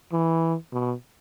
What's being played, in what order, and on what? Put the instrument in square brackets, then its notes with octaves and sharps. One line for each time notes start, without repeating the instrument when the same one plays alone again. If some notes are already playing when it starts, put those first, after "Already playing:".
[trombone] E3
B2